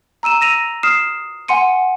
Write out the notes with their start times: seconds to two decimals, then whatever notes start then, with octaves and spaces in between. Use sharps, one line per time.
0.23 A#5 E6 D#7 E7
0.41 E6 A#6 D#7 F7
0.83 D#6 F6 C7 E7
1.48 F#5 G#5 C6 C#7 D#7